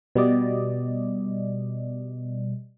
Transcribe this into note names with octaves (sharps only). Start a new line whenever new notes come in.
B2 G3 B3 D5 D#5